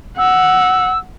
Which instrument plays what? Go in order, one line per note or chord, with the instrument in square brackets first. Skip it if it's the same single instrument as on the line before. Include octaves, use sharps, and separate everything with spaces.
[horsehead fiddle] F#5 [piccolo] E6